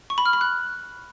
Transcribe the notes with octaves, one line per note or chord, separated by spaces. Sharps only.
C#6
B5
F6
B5
F#6